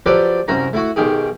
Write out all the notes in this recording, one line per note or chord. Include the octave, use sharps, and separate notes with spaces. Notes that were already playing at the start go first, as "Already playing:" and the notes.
F3 F#3 G4 A4 B4 D5
C2 F#2 F#4 A#5
A3 E4 F#4 F#5
B1 D#3 G4 G#4